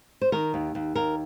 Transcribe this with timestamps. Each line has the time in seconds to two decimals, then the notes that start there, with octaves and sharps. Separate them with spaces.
0.21 C5
0.32 D#3 A#4
0.54 D#2
0.75 D#2
0.95 D#2 A#4